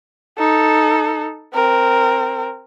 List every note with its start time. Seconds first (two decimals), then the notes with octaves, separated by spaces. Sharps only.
0.38 D#4 A4
1.54 C4 A#4